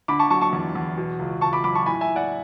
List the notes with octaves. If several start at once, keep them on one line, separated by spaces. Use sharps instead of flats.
D3 B5 D6
A5 C#6
F#3 A5 C#6
A5 C#6
E2
E2
B2
C#2
C#2 A5 C#6
B5 D6
F#3 B5 D6
A5 C#6
A2 G#5 B5
E5 G#5
A2
D5 F#5